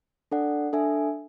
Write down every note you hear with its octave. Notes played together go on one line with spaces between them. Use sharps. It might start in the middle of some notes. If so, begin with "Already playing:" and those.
D4 A4 D5 F#5
D4 A4 E5 G#5